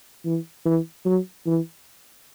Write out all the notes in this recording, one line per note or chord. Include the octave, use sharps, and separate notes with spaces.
E3
E3
F#3
E3